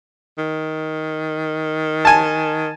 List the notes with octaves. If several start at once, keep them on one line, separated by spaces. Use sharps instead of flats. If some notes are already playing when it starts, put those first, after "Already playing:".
D#3
G#5 A5